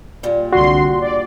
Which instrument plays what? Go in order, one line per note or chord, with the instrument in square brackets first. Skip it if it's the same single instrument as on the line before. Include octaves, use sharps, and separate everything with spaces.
[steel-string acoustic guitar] A#2 G3
[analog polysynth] C2 D3 C6 [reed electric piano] F#4
[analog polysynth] D5